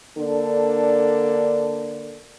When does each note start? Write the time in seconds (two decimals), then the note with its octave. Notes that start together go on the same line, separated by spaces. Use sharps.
0.17 D3 A#3 D4 A4